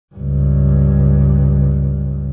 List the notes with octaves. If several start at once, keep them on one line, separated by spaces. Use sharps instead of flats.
C#2 G2